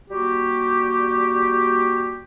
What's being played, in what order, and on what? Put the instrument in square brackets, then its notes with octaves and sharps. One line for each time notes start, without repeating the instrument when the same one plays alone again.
[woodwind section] G3 A#3 F#4 G4